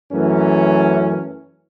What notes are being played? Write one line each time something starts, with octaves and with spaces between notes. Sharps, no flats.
F#2 E3 A3 C#4